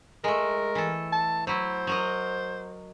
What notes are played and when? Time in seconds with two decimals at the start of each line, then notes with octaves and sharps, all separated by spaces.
0.24 G#3 A3 A#4
0.75 E3 A4
1.13 A5
1.47 F#3 E4 C5
1.87 F#3 A#4 D#5